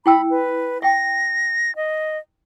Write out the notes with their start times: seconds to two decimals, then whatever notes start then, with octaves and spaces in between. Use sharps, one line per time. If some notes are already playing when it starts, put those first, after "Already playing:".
0.06 E4 G5 B5 E6
0.30 B4
0.82 E5 G5 A#6
1.76 D#5